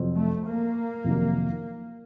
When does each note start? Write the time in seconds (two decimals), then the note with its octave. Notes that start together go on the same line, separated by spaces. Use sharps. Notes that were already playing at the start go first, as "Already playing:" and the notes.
Already playing: F2 C3 F#3 C4
0.17 A3
0.46 A#3
1.04 F2 C3 D#3 F#3